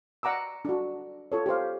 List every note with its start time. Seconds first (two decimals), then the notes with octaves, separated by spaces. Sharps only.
0.23 D5 F#5 A#5 D6 E6
0.65 D4 F#4
1.32 F4 A4 C#5
1.46 G4 A4 C5 F5